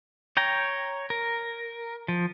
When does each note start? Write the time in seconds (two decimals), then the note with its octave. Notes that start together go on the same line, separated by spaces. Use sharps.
0.37 C#5 G5 A#5
1.10 A#4
2.08 F3